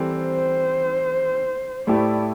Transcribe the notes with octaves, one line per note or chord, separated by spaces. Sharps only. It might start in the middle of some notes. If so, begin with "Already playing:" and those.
Already playing: E3 G3 C4 A4
C5
A2 A3 E4 G4 D5